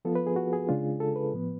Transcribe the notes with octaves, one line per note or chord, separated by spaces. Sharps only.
F3 B3 F4 A4
B4
G#4
F#4
G#4
C#3 G#3 D4 F4
A4
B4
A2 F3 B3